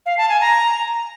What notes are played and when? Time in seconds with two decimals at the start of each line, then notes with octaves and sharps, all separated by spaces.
0.06 F5
0.18 A5
0.29 G#5
0.41 A#5